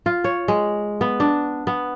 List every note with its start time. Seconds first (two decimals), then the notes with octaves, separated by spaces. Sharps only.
0.06 F4
0.24 C#5
0.48 G#3
1.01 B3
1.20 D4
1.67 B3